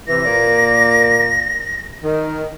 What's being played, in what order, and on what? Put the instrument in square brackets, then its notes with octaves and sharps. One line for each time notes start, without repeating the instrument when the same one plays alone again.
[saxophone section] C3 E3 [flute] A#6
[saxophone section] A#2 A#3 D5
D#3